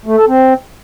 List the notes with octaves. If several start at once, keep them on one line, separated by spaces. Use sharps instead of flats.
A3
A4
C4